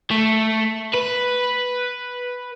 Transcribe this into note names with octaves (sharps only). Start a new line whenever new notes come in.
A3
B4